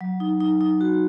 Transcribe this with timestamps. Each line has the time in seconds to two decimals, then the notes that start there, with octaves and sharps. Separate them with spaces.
0.01 F#3
0.20 D#4
0.40 D#4
0.61 D#4
0.81 F#4